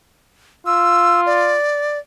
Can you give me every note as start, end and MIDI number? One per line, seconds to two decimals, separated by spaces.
0.66 1.55 65
0.66 1.21 88
1.26 1.99 74